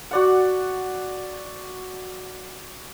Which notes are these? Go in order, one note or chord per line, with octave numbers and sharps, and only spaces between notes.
F#4 D5 F#5